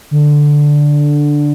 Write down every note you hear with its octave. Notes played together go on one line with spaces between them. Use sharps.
D3